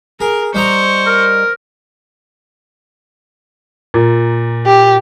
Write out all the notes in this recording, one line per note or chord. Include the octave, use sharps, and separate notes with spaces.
G#4 A#4
G3 D#4 C5 A#5 C#6
A#4
A#2
G4